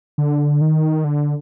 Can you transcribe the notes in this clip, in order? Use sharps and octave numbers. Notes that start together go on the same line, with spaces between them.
D3
D#3
D3